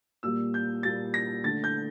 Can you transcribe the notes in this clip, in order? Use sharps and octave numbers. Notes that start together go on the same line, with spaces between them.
A#2 G3 A#3 E6
G6
A#2 G3 A#3 A6
A#6
D3 A3 A6
G6